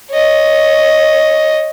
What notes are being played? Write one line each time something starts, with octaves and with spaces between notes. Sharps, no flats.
C#5 D#5